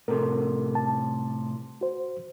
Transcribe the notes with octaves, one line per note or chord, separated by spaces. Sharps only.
A2 C3 A4 A#4
A5
F#4 C5